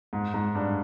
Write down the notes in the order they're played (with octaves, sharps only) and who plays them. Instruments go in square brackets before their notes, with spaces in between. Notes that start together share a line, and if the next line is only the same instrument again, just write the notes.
[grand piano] G#2
G#2
G2